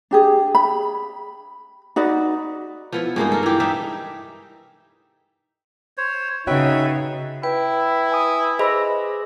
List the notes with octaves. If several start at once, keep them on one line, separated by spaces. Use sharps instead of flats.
D4 G4 G#4
B5
D#4 F#4 B4 D5
F3 B3 E4
G2 G#3 A#3 D#4
A4 A#4
E3 G4
G3 D#4 E5
C5 C#5
C#3 D#4 F#4 B4 C#5 E5 G5
E4 B4 G5
G#5 D#6
G#4 C5 D#5 B5 E6